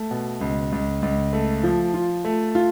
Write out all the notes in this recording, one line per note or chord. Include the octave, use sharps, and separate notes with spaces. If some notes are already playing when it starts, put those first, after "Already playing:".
Already playing: A3
B2
C#2
C#2
C#2
A3
F3
F4
A3
F4